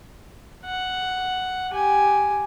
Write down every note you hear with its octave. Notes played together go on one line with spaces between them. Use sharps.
F#5
G4 G#5